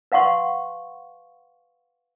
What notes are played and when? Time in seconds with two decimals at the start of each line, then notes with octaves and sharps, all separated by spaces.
0.12 B4 F5 F#5 C6 C#6